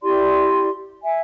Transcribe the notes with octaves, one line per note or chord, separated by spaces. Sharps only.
E4 G4 D5 C6
E5 G#5